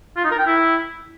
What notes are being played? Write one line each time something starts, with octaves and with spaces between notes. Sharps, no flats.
F4
D#4
A#4
G5
E4